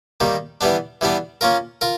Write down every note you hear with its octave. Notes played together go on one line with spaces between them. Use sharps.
D#3 G3 A#3
E3 G3 B3 D4
E3 G3 B3 D4
A#3 C#4 F4 A#4
F4 A#4